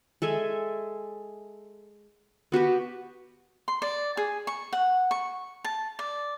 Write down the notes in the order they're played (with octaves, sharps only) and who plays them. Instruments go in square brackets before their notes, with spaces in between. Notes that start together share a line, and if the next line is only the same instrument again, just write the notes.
[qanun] G#3 A4 E5 G#5
B3 F#4 G4 B4
[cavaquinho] C6
D5
G#4
C#6
F#5
C#6
A5
D5